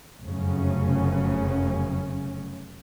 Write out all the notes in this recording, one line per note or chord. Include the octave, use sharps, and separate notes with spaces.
F1 F#2 C#3 C#4